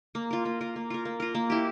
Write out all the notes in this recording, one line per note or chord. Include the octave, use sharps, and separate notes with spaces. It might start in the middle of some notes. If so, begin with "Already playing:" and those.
A#3
F4 A#4
A#3
F4 A#4
A#3
F4 A#4
A#3
F4 A#4
A#3
E4 G4